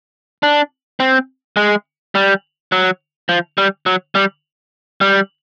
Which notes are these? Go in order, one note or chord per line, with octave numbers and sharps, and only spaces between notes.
D4
C4
G#3
G3
F#3
F3
G3
F#3
G3
G3